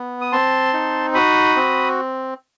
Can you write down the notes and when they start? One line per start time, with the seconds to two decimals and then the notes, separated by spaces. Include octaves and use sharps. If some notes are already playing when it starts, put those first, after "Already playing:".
Already playing: B3
0.21 D#6
0.32 C4 A5 C6
0.73 D#4
1.14 F#4 B5 D#6
1.56 C4